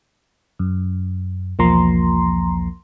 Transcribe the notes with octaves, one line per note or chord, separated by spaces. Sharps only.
F#2
B1 E2 F3 A#3 A#5 C6